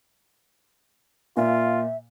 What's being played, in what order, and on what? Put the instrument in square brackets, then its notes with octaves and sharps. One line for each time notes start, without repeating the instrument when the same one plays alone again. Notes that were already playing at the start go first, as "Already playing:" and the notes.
[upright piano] A#2 [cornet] F4 [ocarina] E5